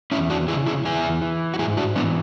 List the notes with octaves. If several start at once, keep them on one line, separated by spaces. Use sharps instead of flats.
E2 C#4 E4
D4 F#4
C#3 E4 G#4
E4 G#4
E2 E4 G#4
E3
F#4
G#2 E4 G#4
D4 F#4
E3 B3 D4